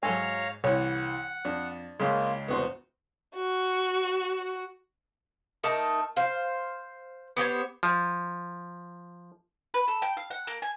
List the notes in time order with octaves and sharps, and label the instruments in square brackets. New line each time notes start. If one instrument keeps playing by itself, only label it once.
[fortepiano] G#2 [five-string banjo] F#3 A4 G#5 [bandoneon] C#5 F5 A#5
[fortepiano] C2 E3 [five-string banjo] C#5 [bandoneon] F#5
[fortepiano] F2 [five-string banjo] D4
[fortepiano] C#2 C#3 G#3 [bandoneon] A#3 F4
[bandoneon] E2 G2 C3 [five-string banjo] B3 F#4 C5
[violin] F#4
[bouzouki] A3 D#4 A#4 A5
C5 F5
B3 G4 C5 C#5
[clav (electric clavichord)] F3
[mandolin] B4
A4
G5
F5
F#5
A#3
G#5